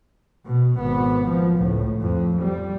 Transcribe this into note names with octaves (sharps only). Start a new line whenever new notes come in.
B2
G#1 B3
F3
C#2 A2
F2
G3